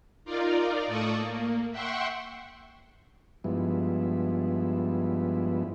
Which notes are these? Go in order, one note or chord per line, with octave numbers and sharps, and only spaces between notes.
D#4 F4 A#4 D5
A2 A4 D5 C#6 D#6
A#3
E5 F#5 G5 C6 C#6
G2 F3 G#3 B3 E4